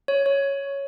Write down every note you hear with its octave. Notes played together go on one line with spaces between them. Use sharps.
C#5
C#5